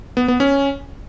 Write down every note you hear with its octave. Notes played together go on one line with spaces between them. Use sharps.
B3
B3
C#4